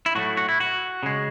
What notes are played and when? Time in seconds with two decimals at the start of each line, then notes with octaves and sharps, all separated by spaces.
0.06 E4
0.15 A2 F#3 A3 F#4
0.37 F#4
0.49 E4
0.60 F#4
1.03 C#3 G#3